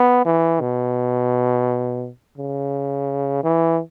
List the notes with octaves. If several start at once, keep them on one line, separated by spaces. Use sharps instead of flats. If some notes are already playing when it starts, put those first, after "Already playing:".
Already playing: B3
E3
B2
C#3
E3